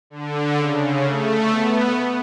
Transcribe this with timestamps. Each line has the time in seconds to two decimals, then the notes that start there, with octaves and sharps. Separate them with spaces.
0.10 D3
0.57 C#3
1.04 A3
1.50 B3